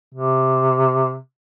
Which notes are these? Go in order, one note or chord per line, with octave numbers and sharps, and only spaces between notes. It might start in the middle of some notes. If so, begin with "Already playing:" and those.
C3